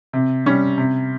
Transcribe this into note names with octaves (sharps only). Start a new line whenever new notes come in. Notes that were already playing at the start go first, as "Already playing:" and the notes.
C3
G3 C#4
C3